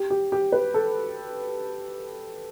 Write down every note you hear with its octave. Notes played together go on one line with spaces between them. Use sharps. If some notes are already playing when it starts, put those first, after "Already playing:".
Already playing: G4
G4
G4
B4
A4